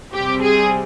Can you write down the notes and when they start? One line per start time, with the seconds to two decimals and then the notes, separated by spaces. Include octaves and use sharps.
0.12 C3 G3 C4 G4
0.41 G#4